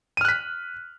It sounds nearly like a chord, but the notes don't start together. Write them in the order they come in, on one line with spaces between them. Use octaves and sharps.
D#7 F6 F#6 B6